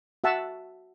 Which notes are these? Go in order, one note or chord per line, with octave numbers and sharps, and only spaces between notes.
F#4 E5 F#5 A5